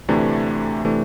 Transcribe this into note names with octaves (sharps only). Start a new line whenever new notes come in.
D2 C3 E3 A3 D4
C3 E3 A3 D4